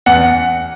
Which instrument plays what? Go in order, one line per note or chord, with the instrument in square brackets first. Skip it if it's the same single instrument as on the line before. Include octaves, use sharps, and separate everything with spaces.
[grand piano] E2 F#5